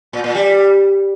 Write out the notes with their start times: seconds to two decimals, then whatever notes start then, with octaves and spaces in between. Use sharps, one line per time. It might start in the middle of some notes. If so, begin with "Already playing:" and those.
0.13 A#2
0.24 A#2
0.35 G3